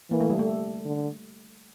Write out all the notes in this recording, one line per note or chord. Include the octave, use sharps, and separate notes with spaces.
E3 A#3
A3
G3
A3
D3